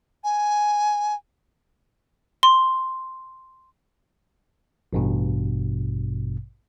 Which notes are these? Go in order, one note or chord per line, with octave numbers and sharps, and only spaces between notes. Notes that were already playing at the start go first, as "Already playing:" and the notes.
G#5
C6
A1 G2 B2